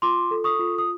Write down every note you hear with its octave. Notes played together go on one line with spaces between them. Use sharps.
F4 C6 D6
A4
C#6 D#6
F4
D#6